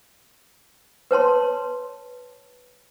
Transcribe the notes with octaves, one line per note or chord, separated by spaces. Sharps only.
B4 C#5 A5 C6